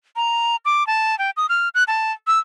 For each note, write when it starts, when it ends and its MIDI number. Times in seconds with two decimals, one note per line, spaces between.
0.16 0.56 82
0.65 0.86 86
0.87 1.18 81
1.19 1.30 79
1.37 1.46 87
1.49 1.69 89
1.75 1.84 90
1.87 2.12 81
2.27 2.39 88